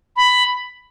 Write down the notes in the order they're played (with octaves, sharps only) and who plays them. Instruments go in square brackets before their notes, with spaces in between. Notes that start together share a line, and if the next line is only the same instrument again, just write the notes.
[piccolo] B5